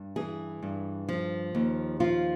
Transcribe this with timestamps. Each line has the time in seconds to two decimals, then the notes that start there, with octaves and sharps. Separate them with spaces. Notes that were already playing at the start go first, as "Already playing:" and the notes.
Already playing: G2
0.16 E3 G#4
0.62 G2
1.09 F3
1.55 D#2
2.00 F3 F4